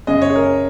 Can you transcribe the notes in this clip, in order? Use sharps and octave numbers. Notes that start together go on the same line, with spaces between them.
F#2 C#3 G#3 D#5
C#5
G#4
A#4